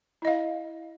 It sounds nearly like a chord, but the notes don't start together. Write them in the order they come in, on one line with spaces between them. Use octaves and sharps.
E4 D#5 F5